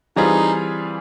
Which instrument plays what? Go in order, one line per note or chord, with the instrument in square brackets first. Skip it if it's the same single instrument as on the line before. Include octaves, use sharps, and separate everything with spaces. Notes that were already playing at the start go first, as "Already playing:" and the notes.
[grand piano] E3 G3 C4 F4 G#4 [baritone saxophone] D#4